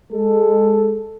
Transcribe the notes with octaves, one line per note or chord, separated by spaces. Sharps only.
G#3 A4